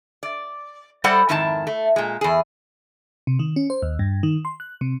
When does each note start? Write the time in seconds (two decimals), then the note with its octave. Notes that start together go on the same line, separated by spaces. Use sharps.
0.23 D5
1.04 G3 A4 C5 D5 F#5
1.29 F2 G#2 D#3 E4 F#4 A5
1.67 A3
1.96 A#2 G#3
2.21 E2 G#4
3.27 C3
3.39 D#3
3.56 C#4
3.70 C5
3.82 D#2
3.99 G2
4.23 D#3
4.45 C6
4.60 F#6
4.81 C3